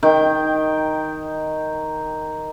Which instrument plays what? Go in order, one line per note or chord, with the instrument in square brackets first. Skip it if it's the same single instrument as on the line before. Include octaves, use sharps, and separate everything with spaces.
[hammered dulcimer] D#3 G5